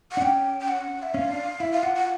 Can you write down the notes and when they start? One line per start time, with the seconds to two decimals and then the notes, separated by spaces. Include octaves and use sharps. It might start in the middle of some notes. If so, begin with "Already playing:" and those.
0.11 F#5
0.17 D4
0.22 C#4 G5
0.60 G5
0.68 F#5
1.02 E5
1.14 C#4 F5
1.29 D4
1.60 E4 E5
1.72 F5
1.83 F4 F#5
1.95 F#5